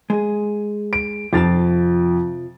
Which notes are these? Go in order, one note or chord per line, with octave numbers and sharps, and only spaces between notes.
G#3 G#4
D7
F2 C3 F4 A5 A6